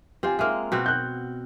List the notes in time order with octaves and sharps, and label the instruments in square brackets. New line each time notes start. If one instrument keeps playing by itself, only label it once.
[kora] C4 F4 C5 [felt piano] G4 G#5
[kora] G#3 A#3 [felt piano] E5 F6
[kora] B2 C4 F#4
[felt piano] F#6 G6